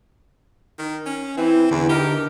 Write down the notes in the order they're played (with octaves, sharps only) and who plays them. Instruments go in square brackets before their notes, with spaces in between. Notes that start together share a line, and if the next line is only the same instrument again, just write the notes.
[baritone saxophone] D#3
C#4
[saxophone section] E3 [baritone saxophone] C4
[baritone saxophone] E2 [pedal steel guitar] D3 [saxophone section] E3
[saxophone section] D#4 A#4 [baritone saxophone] G4